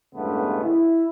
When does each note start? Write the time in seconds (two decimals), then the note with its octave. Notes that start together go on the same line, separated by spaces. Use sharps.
0.15 E2 G2 C#3 G#3 A3 B3
0.64 E4